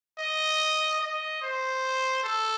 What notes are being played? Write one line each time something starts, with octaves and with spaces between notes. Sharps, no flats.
D#5
D#5
C5
A4